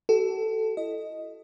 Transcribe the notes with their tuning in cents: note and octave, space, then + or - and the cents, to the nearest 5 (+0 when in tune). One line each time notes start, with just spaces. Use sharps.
F#4 +45 A4 +0
E4 +25 D#5 +0